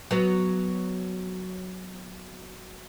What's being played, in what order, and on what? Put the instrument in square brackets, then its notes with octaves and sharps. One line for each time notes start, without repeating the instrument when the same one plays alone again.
[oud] F#3 B3